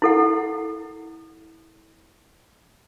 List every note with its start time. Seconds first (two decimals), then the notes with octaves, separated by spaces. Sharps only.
0.02 E4 A4 F#5